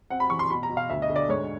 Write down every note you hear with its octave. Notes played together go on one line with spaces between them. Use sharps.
C4 F#5
B5
E3 C#6
C6
B2 B5
A#5
B2
F5
D2 E5
D#5
D3
D5
G#2 C#5